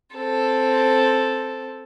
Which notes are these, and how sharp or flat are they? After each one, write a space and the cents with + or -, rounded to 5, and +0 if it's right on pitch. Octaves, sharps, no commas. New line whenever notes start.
C4 +0 A4 +0